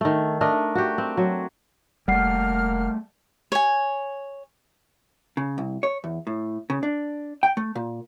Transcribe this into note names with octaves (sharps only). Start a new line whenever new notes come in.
D#3 A3
A3 D4 A#4 D#5
F#4 G4
C4
F#3
F1 G3 A3 A#3 F#5 F6 C7
C#5 G#5
C#3
C2
C#5
E2
A2
C#3
D4
G5
A3
A#2